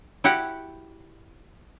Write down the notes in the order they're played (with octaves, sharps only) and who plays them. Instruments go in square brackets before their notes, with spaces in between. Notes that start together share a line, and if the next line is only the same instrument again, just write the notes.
[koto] E4 F#4 G4 F#5